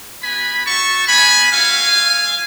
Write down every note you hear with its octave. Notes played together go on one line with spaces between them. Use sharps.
B3 F#4 G#5 B5
A3 D4 F#4 A5 C#6
B3 F4 G#5 B5
A3 C#4 F#4 F5 G#5
A3 F4